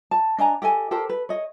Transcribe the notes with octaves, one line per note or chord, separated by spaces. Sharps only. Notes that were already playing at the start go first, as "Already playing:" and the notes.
A5
D4 D#5 G#5 A#5
G4 A4 D#5 G#5
G4 A4 A#4 C5
B4
C#5 D#5